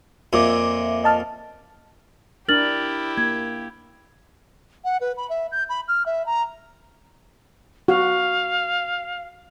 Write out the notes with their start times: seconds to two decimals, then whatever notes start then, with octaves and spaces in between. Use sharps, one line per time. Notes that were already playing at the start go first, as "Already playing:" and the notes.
0.33 F2 A#2 E5 D6
1.04 D#5 A5 F6
2.48 D4 E4 G4 A#4 F6 A6 F#7
3.18 A#3 G#6
4.84 F#5
5.01 B4
5.17 B5
5.30 E5
5.52 G6
5.69 B5
5.88 F6
6.06 E5
6.26 A#5
7.88 F#4 F5